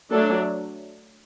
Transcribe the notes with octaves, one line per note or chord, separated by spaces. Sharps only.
F#3 A3 D4 A4